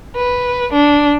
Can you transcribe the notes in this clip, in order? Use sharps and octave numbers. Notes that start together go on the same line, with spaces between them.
B4
D4